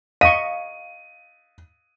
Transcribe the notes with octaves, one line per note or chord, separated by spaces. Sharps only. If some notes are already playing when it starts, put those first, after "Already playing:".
D#5 F5 C#6 D#7